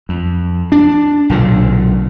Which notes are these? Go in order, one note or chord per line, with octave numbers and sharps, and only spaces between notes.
F2
D4
B1 A#2 D3